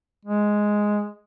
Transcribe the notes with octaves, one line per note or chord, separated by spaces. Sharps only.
G#3